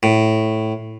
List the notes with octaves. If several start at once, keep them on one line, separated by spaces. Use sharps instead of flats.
A2